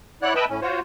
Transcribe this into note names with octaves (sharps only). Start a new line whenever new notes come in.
E4 C#5 D5 F#5 F#6
B4 D#5 E5 G5 A5 B5
A2 C#4
F4 F#4 C5 C#5